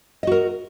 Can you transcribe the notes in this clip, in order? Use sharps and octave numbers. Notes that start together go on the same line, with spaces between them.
F#4 A#4 D#5